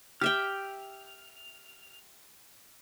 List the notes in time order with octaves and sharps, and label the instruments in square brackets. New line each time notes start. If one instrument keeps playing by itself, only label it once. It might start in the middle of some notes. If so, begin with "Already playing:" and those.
[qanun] G4 E5 G5 [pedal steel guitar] F6